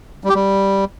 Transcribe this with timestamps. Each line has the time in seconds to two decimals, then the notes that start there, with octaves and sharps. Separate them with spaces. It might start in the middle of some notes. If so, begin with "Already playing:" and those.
0.24 G3
0.29 G4
0.35 G3